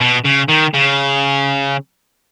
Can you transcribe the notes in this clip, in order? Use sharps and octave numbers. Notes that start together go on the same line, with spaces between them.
B2
C#3
D#3
C#3